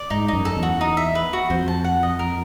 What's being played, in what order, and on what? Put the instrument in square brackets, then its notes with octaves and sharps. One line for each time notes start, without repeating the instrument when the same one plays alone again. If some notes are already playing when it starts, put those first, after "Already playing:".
Already playing: [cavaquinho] D5
[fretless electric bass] G#2 [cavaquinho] D#4
[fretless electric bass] F#2 [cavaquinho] D#4
[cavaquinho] A4
[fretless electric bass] E2
[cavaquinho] F#4
D#4
E5
B4
F#4
[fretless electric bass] F2 [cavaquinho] C5
[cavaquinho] A5
F#5
D#5
A#4